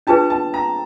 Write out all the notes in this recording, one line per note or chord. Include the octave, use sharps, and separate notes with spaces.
D4 F4 G#4 B4 A5
A5
A#5